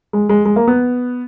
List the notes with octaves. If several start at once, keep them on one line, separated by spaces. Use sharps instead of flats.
G#3
G#3
G#3
A#3
B3